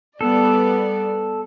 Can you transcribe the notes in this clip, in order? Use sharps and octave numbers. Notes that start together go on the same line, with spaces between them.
G3 B3 A4 D5